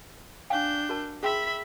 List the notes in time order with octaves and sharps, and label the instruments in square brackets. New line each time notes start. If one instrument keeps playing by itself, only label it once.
[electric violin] D4 G6 [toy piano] F5 G5 G#5
[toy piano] F#4 A#4 A5
[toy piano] G#4 G5 C6 [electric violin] E5 B5